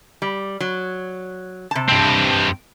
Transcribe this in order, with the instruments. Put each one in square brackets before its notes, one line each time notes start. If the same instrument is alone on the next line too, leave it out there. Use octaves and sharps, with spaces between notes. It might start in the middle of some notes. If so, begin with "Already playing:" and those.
[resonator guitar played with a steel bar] G3
F#3
C3 A5
[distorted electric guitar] G2 C4